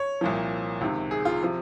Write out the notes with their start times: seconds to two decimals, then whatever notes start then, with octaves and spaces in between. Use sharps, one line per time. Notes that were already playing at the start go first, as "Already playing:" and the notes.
Already playing: C#5
0.21 C2 A#2 F3
0.81 C#2 C3 D#3
1.11 G#4
1.25 F4
1.43 C3 F3